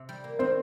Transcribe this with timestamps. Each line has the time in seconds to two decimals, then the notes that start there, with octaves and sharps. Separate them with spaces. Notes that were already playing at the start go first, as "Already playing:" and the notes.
Already playing: C3
0.09 G3
0.24 A#3
0.39 D#3 C4 C5